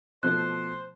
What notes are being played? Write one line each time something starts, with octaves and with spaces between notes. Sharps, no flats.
B2 F3 A3 C5 F#6